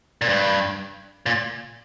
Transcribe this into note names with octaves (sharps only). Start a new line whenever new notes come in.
A#2
G2
A#2